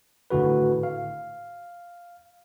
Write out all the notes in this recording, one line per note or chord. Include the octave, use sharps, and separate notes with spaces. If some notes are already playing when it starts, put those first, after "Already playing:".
G#1 A2 D3 F#4 B4
F5